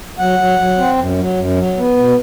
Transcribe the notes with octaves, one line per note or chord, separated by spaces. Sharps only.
F#3 F#5
F#3
F#3
C4
F#2
F#3
F#2
F#3
B3
B2